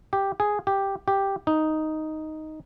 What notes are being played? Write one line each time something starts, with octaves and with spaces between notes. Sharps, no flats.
G4
G#4
G4
G4
D#4